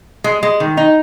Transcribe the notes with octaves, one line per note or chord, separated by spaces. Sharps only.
G#3
G#3
D#3
D#4